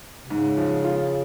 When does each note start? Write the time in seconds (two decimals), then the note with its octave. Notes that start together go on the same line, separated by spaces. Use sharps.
0.22 C3
0.30 G#2 C#3
0.57 F3
0.84 F4